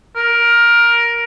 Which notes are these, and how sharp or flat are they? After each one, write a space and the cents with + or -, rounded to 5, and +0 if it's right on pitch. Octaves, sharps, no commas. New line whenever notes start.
A#4 +15